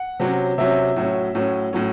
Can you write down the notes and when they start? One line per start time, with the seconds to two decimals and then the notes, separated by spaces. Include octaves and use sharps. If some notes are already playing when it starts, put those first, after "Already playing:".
Already playing: F#5
0.20 C3 F#3 C#4
0.58 C3 F#3 C#4 E5
0.96 A2 F#3 C#4
1.35 A2 F#3 C#4
1.73 A2 F#3 C#4